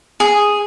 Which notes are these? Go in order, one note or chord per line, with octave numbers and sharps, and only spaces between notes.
G#4